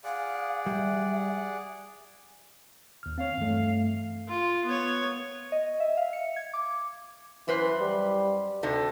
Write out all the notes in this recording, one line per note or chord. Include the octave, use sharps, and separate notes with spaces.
G#4 D5 F5 F#5
G3 E5
D#2 F6
C4 C#5 F5
G2 E3 A3
F4
B3 C#5
D#5
E5
F5
C#7
G#6
D6
F#2 E3 B4 C5
G3
D2 C3 A3 D#4